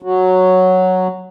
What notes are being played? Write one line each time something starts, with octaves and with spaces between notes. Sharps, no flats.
F#3